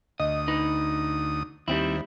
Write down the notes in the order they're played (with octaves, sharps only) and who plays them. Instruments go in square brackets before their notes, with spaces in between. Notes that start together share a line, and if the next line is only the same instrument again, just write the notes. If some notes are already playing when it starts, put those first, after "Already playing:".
[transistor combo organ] D2 D#6 [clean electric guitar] D#5
[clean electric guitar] D#4 B4
[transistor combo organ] D#2 [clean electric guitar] G3 C4 E4